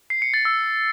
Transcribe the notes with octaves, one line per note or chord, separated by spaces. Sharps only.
C7
C#7
A6
E6